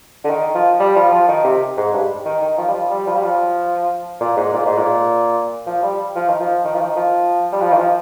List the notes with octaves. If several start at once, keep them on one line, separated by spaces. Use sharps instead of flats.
D3
D#3
F3
G3
F3
F3
D#3
C3
G#2
G2
D#3
D#3
F3
G3
F3
G3
F3
G3
F3
A#2
G#2
A#2
G#2
A#2
F3
G3
F3
D#3
F3
D#3
F3
D#3
F3
G3
F3
D#3
F3